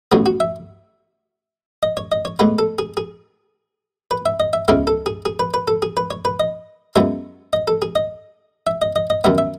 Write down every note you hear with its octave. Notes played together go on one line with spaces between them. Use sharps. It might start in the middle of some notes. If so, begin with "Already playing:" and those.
A1 A2 F#3 B3 G#4
F#4
E5
D#5
C#5
D#5
C#5
A2 G#3 B3 B4
A4
G#4
G#4
B4
E5
D#5
E5
C#2 C#3 G#3 B3 E5
A4
G#4
G#4
B4
B4
A4
G#4
B4
C#5
B4
D#5
F#2 E3 G#3 B3 E5
D#5
A4
G#4
D#5
E5
D#5
D#5
D#5
F#2 D#3 F#3 B3 E5
E5